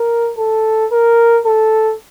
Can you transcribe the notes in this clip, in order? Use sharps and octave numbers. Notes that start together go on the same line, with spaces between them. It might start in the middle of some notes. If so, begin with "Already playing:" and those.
Already playing: A#4
A4
A#4
A4